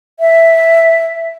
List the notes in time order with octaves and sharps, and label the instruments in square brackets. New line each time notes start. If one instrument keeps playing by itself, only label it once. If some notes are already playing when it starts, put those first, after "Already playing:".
[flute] E5